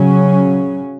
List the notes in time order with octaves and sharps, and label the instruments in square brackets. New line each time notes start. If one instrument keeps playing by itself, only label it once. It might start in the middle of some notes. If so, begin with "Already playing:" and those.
Already playing: [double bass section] C#3 F#3 C#4